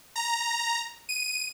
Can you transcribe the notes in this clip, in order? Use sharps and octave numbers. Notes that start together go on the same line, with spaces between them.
A#5
D#7